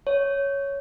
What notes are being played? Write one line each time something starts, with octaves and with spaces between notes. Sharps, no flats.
C#5